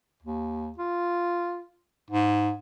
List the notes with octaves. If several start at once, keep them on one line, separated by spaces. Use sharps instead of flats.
D#2
F4
G#2